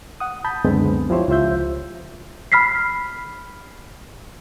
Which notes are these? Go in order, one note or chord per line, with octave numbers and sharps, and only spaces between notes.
F#5 D#6
A5 B5 G6
C#2 F#2 D3 G#3 B3 C4
F3 E4 G4 C5 C#5
C#2 F4 C5 E5 G6
B5 F6 B6 C7